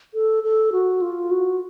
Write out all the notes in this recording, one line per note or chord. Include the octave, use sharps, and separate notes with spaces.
A4
A4
F#4
F4
F#4